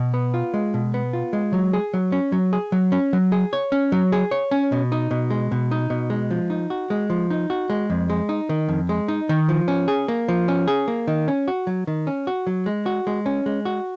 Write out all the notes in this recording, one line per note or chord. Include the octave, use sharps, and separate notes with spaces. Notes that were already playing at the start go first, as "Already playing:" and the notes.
Already playing: B2
B3
F4
G#3
B2
B3
F4
G#3
F#3
G#4
F#3
C#4
F#3
G#4
F#3
C#4
F#3
G#4
C#5
C#4
F#3
G#4
C#5
C#4
B2
D#4
B2
G#3
B2
D#4
B2
G#3
F3
D#4
F#4
G#3
F3
D#4
F#4
G#3
F2
G#3
D#4
D#3
F2
G#3
D#4
D#3
F3
C#4
G#4
A#3
F3
C#4
G#4
A#3
D#3
C#4
F#4
F#3
D#3
C#4
F#4
F#3
G#3
F#4
G#3
C#4
G#3
F#4